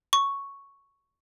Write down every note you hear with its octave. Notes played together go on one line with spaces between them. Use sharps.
C#6